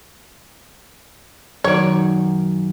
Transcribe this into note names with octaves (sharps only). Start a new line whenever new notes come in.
F#2 D#3 C#5 D5